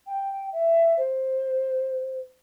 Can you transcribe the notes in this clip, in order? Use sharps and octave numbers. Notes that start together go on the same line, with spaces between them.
G5
E5
C5